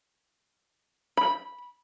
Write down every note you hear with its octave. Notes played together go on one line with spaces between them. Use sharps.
B5